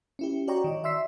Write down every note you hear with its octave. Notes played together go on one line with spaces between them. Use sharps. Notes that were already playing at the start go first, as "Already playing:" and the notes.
C#4 E4 G4
F#4 C#5 D5 G5 A#5 C#6
D#3 D#5
D5 E5 C6 E6 B6 C7